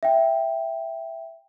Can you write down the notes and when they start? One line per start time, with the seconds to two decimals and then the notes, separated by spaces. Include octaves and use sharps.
0.03 E5 G5